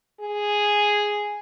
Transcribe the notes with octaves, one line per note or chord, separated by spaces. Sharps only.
G#4